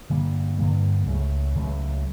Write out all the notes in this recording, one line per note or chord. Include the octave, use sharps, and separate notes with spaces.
G2 D3 G3 A#3
G2 D3 G3 A#3
C#2 C#3 F#3 A3
C#2 C#3 F#3 A3